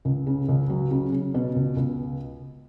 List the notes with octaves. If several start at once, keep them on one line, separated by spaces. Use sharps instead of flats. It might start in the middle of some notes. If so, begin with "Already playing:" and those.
C#2
C#3
C#2
F#3
C#3
C#3
B2
C#2
C#2